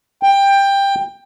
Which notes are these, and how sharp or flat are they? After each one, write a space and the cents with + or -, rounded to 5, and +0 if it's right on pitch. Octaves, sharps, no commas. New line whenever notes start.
G5 +15